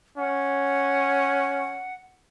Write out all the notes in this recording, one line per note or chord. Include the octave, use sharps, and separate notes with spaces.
C#4 F#5